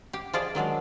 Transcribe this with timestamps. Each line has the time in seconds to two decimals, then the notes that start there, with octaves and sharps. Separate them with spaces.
0.13 G4
0.33 F3 F4 G#4 D5 D#5
0.55 D#3 F#3 G#3 D4